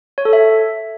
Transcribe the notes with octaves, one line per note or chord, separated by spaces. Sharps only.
C#5
A4
E5